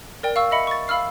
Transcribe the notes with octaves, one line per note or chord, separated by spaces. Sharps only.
A#4 D5 G5
F5 C#6 E6
D#5 E5 B5 C#7
C#6 A6
F5 B5 E6 F6 C7